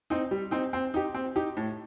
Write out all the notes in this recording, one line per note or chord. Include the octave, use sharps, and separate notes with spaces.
C4 D#4
G3
C4 D#4
C4
D#4 G4
C4
D#4 G4
A2